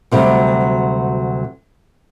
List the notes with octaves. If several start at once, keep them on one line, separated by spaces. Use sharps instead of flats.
D2 C3 F#3 G3